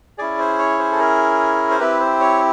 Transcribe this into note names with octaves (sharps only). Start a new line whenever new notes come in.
C#4 E4 G#4 D5
C5
C#5
C5
A4
A#4
C5
C4 E4 G4 B4
C5
C#5